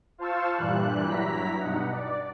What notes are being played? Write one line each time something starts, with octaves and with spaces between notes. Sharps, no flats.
F4 C5 F5 A5 C#6 E6
G2 A#2 E3 G3 F#6
G2 F#3 E4 A#5 B6
G2 B2 D#4 F#5
D5